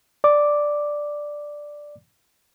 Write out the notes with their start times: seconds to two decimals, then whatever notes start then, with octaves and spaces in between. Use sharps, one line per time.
0.24 D5 D6